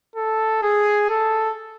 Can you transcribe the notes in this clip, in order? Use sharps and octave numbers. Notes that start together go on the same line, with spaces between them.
A4
G#4
A4